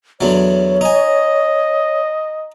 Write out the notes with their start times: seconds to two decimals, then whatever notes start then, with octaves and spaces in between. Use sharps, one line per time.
0.21 E2 D3 F#3 C#5
0.81 D#4 D#5 G#5